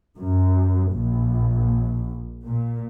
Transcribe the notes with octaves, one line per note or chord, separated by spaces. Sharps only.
F#2
A#1
A#2